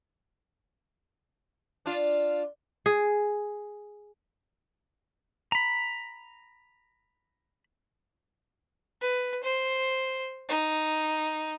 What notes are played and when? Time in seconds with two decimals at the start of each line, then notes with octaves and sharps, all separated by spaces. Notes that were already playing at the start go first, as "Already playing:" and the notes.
1.86 D4 F4
2.86 G#4
5.52 A#5 B5
9.01 B4
9.44 C5
10.49 D#4